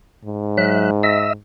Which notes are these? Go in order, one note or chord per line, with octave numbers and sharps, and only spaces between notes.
G#2
F#3 E5 F#6
D#5 E5 E6